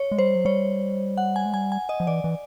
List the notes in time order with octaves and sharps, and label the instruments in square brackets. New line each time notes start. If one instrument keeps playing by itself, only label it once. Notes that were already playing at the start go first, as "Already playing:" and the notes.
Already playing: [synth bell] C#5
[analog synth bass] G#3
[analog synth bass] G3 [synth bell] C5
[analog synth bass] F#3
[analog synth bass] G3 [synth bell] C#5
[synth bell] F#5
G#5
[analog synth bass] G#3
[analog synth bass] G3 [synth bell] G#5
[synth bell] G#5
D#5
[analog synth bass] F3
[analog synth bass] E3 [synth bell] D5
[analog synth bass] E3